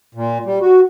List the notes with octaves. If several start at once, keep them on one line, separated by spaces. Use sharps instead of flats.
A#2
G3
F#4